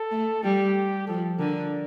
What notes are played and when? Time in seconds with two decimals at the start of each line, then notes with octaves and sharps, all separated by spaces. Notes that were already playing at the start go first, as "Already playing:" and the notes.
Already playing: A4
0.11 A3
0.43 G3 G4
1.07 F3 A4
1.39 D3 A#4